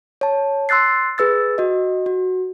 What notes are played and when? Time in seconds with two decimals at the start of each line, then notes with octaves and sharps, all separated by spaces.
0.21 C#5 A5
0.69 C6 E6 F#6 A6 C7
1.18 G#4 B4 E6 A6
1.58 F#4 D#5
2.06 F#4